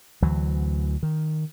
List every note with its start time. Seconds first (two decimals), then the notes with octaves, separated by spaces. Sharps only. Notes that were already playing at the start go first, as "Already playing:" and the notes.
0.22 D2 E3 F#3
1.03 D#3